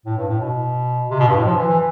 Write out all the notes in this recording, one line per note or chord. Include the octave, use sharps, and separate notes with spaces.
A2
G2
A2
B2
C3
B2
G2
A2
F3
E3
E3